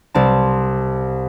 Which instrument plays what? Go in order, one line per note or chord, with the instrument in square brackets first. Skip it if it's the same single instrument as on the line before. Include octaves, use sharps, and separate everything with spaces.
[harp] C2 C4 A5